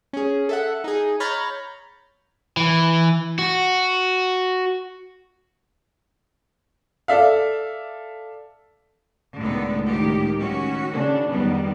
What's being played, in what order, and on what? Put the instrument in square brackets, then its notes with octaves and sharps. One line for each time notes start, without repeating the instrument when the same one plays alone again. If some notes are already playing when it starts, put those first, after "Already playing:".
[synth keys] C#4 G#4
A4 E5 F#5
D#4 G#4
C#5 A#5 B5 F6 G6 A6
[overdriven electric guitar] E3
F#4
[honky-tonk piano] A4 D5 E5 F5
[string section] C#2 A2 [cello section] D3 D#3 B3
[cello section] D#3 G4
D#3 C#4 F#4
[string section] C#3 D4
[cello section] F2 D#3 G3 [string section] B3